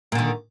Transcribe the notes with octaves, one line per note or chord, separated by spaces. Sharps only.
A#2 D3 D#3